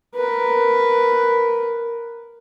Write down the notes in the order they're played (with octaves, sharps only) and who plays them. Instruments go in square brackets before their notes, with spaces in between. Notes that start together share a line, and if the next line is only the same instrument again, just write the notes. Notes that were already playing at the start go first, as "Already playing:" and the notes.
[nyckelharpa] A#4 B4